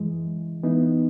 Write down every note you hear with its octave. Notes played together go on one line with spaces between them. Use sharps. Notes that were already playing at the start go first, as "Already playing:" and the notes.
Already playing: F#2 E3 G#3
E3 B3 D#4